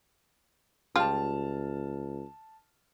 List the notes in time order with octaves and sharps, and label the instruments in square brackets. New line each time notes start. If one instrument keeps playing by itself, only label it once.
[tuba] C#2 [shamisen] G3 F4 [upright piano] A5 F6